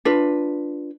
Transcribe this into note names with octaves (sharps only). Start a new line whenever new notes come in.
D4 F4 B4